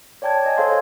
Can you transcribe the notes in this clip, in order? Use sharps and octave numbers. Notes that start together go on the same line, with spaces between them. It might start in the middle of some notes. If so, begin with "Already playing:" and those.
C#5 D5 G5 A5 G#6
D#5 G#5
A4 C5 C#5 F5 C6 G#6